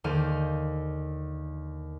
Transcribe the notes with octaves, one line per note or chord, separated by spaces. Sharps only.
D#2 D3 C5 F5 D#7